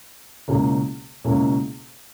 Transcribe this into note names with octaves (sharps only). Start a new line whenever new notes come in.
C#2 B2 A#3 C#4 E4
C#2 B2 A#3 C#4 E4